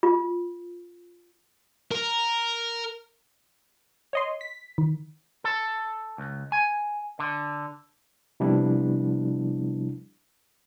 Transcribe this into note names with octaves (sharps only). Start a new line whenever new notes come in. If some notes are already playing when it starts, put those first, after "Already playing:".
F4
A#4
C#5 D#5 C6
B6
D#3
A4
C#2
G#5
D3
C3 F3 G3 B3 D4 E4